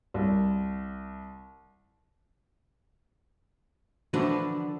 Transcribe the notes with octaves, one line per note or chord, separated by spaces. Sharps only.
C2
D3 E3 F3 D4 F#4 B4